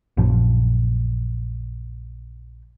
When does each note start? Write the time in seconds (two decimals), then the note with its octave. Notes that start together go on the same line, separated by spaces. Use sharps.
0.17 A#1 F#2 A#2 F3